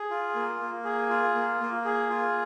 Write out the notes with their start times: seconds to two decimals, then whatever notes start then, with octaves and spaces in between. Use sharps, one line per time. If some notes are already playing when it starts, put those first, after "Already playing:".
Already playing: G#4
0.10 F4
0.35 A#3
0.60 A#3
0.85 G#4
1.10 F4
1.35 A#3
1.60 A#3
1.85 G#4
2.10 F4